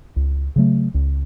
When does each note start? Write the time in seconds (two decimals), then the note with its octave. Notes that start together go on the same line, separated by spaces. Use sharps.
0.16 C#2
0.56 C#3 F#3 A3
0.94 C#2